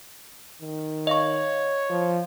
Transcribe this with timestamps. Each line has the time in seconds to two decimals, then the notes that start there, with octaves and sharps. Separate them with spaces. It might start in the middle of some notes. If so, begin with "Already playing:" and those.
0.61 D#3
1.07 C#5 D#5 F5 C#6
1.90 F3